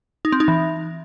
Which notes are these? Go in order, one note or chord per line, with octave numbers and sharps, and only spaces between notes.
D#4
C4
D#4
E3